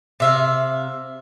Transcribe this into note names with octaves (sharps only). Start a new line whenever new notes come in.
C3 E5 F5